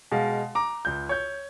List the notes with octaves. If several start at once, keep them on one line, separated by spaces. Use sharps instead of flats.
B2 G#3 F5
A#5 D6
C#2 G6
C#5 G6